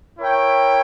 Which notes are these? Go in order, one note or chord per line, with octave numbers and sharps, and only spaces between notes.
E4 A#4 C#5 G5